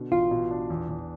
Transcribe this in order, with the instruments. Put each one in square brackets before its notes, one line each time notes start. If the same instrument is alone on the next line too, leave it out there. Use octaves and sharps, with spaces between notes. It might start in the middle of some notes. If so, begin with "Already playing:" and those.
Already playing: [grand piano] B2 D3
[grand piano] A1 [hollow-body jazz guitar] F4
[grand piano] B2
D4
E2
E2